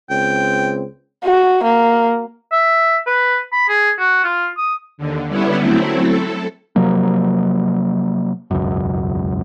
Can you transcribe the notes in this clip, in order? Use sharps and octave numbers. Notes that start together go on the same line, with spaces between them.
C#2 C4 G5
F#4
A#3
E5
B4
B5
G#4
F#4
F4
D#6
D#2 D3
D3 G3 B3 C#4 E4
F#3 A3 C4 E4
A4
C3 F3 F#3 A#3
E1 C#2 F#2